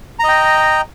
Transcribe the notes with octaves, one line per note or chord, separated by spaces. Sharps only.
D#5 G5 A#5